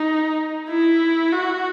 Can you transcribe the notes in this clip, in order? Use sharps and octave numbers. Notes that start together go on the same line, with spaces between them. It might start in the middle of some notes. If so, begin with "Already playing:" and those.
Already playing: D#4
E4
F#4